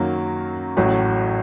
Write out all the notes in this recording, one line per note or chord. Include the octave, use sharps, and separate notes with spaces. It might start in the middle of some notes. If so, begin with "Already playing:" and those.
Already playing: F#2 D#3 F#3 A#3
A1 A2 F#3